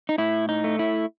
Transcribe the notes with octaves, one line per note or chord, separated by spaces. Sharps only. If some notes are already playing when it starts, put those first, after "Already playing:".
D#4
A2 E4
D#4
A3
E4